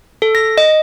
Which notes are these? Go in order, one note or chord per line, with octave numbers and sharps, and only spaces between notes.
A4
A#6
D#5